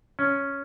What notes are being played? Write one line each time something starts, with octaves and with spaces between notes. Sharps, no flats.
C#4